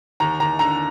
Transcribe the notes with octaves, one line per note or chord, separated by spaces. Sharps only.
D#2 A#5
D#2 A#5
D3 A#5